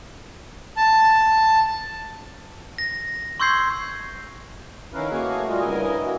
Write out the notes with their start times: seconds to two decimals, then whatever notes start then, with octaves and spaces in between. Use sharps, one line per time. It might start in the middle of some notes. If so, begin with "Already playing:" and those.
0.77 A5
2.78 A#6
3.40 C6 C#6 E6 G6 G#6 C7
4.94 D#3 C#4 E4 A#4 B4 F5
5.11 A3 A#3 F#4 G#4 C#5 F5
5.48 G3 F4 F#4 D#5
5.60 G2 C#3 E4 A#4 D#5 G#5
6.05 A#3 F#4